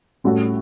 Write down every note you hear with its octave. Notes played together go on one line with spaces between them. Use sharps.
A2 G3 C#4 F#4 A4